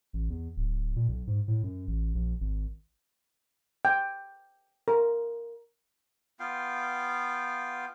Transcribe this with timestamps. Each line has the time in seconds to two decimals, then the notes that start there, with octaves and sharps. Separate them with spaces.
0.13 A1
0.30 E2
0.56 D1
0.96 A#2
1.08 B1
1.27 G#2
1.48 A2
1.63 F#2
1.87 A1
2.15 A#1
2.41 G#1
3.85 G5
4.88 A#4
6.40 B3 F4 F5 G5